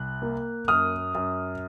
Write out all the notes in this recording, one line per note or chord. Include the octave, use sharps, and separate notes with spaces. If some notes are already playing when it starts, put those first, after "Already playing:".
Already playing: C2 F#6
A#3
F#2 D#6 F6
F#2